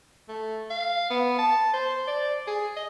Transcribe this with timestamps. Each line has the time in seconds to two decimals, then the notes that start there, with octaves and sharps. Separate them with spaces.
0.28 A3
0.70 F5
1.10 B3
1.38 A5
1.73 C5
2.07 D5
2.47 G#4
2.76 D#5